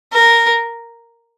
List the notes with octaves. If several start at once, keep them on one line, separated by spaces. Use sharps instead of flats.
A#4